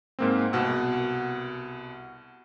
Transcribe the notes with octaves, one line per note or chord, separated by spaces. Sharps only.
G#2 A#3 C4
C2 B2 F#5 E6